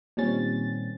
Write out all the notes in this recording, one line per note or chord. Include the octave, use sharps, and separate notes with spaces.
A#2 D#3 G3 C4 C#4 A6